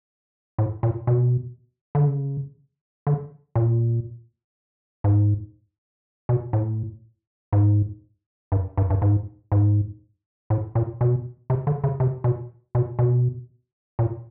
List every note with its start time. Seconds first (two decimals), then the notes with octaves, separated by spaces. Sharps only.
0.58 A2
0.83 A#2
1.07 B2
1.95 D3
2.07 C#3
3.07 D3
3.55 A#2
5.04 G#2
6.29 B2
6.53 A2
7.53 G#2
8.52 G2
8.77 G2
8.90 G2
9.02 G#2
9.52 G#2
10.50 A2
10.75 A#2
11.01 B2
11.50 C3
11.67 D3
11.84 C#3
12.00 C3
12.24 B2
12.75 B2
12.99 B2
13.99 A#2